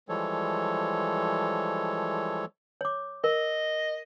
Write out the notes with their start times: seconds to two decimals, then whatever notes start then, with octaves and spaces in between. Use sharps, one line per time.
0.09 E3 F3 G3 G#3 A4 C#5
2.81 C#5 D6
3.24 A#4 D#5